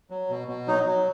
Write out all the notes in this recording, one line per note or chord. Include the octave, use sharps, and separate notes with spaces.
F#3
B2
B2
F#3 D#4
F#3